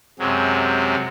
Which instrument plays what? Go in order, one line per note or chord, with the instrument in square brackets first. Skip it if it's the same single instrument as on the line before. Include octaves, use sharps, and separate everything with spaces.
[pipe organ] F#2 C3 F#3 G#3